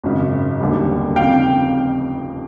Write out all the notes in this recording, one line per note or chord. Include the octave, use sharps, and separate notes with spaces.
G#1 F#2 C#3
E1 D#2 D3 G3
F1 F2 C#3 F5 G5